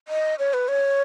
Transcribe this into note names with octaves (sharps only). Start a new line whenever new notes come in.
D#5
C#5
B4
C#5